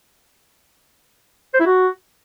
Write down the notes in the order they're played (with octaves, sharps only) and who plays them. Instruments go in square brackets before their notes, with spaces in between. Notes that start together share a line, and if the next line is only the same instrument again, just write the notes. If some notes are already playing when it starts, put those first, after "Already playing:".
[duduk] C5
E4
F#4